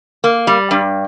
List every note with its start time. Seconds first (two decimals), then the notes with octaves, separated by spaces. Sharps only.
0.24 A#3
0.47 G3
0.71 G2